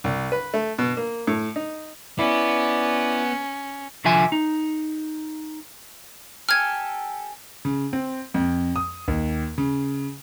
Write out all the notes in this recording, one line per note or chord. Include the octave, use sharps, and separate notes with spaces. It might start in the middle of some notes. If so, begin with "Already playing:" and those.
C2
B4
A3
B2
A#3
A2
D#4
B3 C#4 E4 D5
C2 D3 F3 E5 G#5
D#4
G4 A4 G#5 F6 G#6
C#3
C4
F2
D#6
D#2
C#3